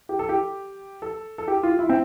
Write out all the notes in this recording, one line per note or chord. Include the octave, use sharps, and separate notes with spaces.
G4
A4
G4
A4
A4
G4
F4
E4
C4